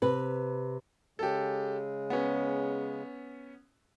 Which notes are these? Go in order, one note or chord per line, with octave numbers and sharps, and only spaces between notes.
C3 B4
C#3 G#3 G4 A4
B3 C#4